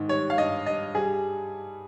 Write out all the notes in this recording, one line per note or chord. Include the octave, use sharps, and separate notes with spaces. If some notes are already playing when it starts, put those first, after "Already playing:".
Already playing: G#2 D#3
G3 C#5
F5
G2 D#5
G2 D#5
G3 G#4